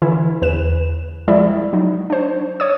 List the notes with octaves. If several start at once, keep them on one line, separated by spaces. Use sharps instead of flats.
D3 E3 E4
E2 B4 E7
F3 G3 G#3 E4 D5
F#3 D#4
D4 C5
C#5 D#6